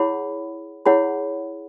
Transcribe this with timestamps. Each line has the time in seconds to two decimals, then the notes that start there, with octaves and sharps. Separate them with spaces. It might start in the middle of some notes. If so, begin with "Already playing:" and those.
Already playing: E4 G#4 C#5 F#5 B5
0.86 E4 G#4 C#5 F#5 B5